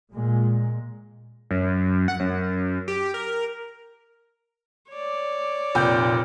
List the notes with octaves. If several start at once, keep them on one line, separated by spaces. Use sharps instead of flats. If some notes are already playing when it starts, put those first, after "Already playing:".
A#2 G#3
F#2
F#5
F#2
G4
A#4
C#5 D5
F1 A#2 G5 G6